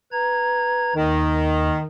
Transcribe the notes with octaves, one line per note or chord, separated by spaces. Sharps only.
B4 A#5 G#6
D#2 D#3